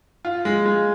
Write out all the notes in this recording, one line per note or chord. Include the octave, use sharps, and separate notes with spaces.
F4
G#3
G#3